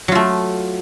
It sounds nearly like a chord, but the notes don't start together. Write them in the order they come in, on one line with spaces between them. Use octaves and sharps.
F#3 F4 A3